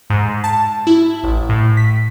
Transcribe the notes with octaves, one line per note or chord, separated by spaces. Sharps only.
G#2
A5
E4
A1
A2
B6